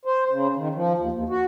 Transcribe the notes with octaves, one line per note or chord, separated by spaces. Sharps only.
C5
C#3
D#3
F3
D#2
D#2
F#4